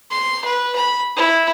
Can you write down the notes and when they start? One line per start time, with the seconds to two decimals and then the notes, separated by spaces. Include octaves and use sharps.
0.11 C6
0.45 B4
0.75 B5
1.16 E4